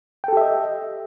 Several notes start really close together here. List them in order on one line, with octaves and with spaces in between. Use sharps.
G5 A4 G4 E5 D#5